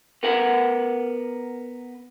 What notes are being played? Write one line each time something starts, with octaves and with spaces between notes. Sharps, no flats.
B3 A#4 F#5